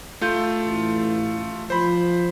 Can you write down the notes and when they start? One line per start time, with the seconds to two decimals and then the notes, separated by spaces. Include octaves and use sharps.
0.21 A3 F4 G6
0.63 A1
1.70 F3 C5 B5